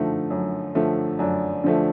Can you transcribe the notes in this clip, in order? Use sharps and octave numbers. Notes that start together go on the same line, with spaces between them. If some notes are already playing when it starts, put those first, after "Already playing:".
Already playing: D3 F3 A3 D#4
F#2
D3 F3 A3
F#2 D4
D3 F3 A3